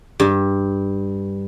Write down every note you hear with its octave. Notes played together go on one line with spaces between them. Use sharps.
G2